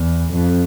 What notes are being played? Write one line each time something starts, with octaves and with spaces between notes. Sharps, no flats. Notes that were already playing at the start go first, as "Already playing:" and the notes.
Already playing: E2
F2